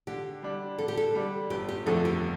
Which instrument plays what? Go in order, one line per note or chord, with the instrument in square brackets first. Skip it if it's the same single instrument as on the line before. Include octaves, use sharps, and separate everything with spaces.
[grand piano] D3 [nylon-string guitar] G4
[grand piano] G3 D4
[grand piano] D3 [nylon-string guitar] A4
[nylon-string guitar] G4
A4
[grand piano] G3 D4
[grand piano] G1 [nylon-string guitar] G4
[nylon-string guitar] G4
[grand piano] F2 D3 F3 A3 [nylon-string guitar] A4
[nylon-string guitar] G4